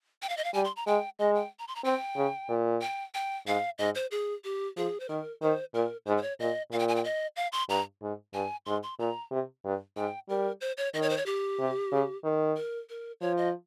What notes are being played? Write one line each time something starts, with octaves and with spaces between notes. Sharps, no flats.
G5
F5
D#5
F5
G3 G#5
C6
A#5
G#3 G5
G#3 D#5
G5
A#5
C6
A#5
C4 G5
C#3
A#2
G5
G5
G#2 F5
G#2 D#5
C5
G#4
G4
F3 G#4
C5
D#3 A#4
D#3 C5
A#2 A#4
G#2 C5
C5
C#5
A#2 D#5
A#2 F5
G5
G#5
G5
D#5
F5
C6
G2 A#5
G#2
G2 G#5
G#2 C6
C6
A#2 A#5
C3
G2
G#2 G5
G3 A#4
C5
C#5
D#3 D#5
C#5
C5
C#5
G4
C3
C#3
D#3
A#4
A#4
F3 C#5
D#5